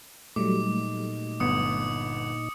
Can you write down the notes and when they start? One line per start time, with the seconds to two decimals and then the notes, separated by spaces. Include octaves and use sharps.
0.36 A#2 F#3 G3 A3 D#4 D6
1.40 G1 B3 D#6 C#7